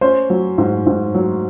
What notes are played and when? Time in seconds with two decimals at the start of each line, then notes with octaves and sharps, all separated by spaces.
0.01 C#4 C5
0.30 F#3
0.58 G#2
0.87 G#2
1.14 F#3